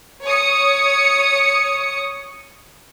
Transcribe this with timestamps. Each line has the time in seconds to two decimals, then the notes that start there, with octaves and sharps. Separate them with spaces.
0.24 C#5 D#6 C#7